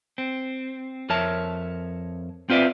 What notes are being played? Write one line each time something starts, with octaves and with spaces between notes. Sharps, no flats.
C4
F2 A#4 C#5 E5 A5
C4 F4 B4 D5 E5